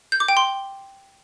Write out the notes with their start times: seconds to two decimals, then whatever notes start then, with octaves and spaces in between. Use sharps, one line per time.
0.12 G6
0.20 D6
0.28 G5
0.37 C6